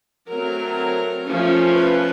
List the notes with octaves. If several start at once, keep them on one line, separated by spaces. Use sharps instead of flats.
F#3 A3 C4 A#4
F3 A3 C#4
B4